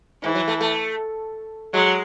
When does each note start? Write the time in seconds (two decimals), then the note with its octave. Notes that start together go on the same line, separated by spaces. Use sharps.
0.23 G#2 E3
0.35 F#3
0.48 A3
0.61 A3
1.73 F#3 G#3